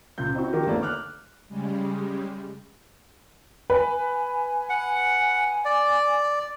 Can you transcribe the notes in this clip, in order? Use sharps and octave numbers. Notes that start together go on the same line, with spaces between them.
C#2 A#2 F4 G6
C4 D#4 E4 F#4
D#3 G4 A#4
G1 D#2 A3 A#3 B4 D5
D6 F6 F#6
C#3 G3 G#3
B4 G#5
F#5
D5